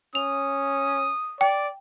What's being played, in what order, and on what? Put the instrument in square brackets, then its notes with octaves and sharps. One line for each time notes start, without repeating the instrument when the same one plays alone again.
[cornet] C#4 [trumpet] D#6 [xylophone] F7
[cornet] D5 [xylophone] G5